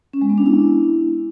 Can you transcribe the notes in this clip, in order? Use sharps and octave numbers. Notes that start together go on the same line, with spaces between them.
C#4
G#3
B3
D4
E4